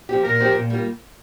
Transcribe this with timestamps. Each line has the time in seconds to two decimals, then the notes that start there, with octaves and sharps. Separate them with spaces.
0.09 F3 C4 G4
0.25 A#2 A#4
0.40 F3 C4 G4
0.55 A#2
0.70 G3 A#3 F4